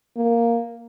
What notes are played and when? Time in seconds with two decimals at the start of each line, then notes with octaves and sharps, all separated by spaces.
0.17 A#3